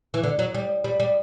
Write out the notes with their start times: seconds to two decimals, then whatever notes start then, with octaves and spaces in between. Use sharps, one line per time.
0.14 E3
0.23 D3
0.39 F#3
0.55 G3
0.84 G3
1.00 G3